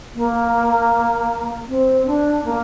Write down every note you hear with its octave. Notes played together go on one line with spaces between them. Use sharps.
A#3
C4
D4
A#3